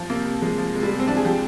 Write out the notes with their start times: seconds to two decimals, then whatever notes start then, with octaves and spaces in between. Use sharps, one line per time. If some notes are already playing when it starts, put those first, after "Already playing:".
Already playing: F3
0.10 C3 A#3
0.25 C3
0.42 F3 G#3
0.58 F3
0.75 C3 G#3
0.83 G3
0.92 C3 G#3
1.00 C4
1.08 F3 D4
1.17 G#4
1.25 F3 G4